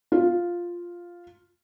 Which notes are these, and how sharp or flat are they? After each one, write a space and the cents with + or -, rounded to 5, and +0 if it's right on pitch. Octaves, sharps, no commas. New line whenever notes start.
F4 +0